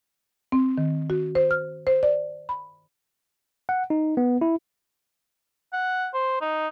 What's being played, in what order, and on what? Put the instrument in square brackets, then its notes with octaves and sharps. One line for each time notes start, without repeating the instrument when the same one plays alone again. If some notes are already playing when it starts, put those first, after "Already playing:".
[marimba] C4
D#3
F#4
C5
F6
C5
D5
B5
[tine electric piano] F#5
D#4
B3
E4
[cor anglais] F#5
C5
D#4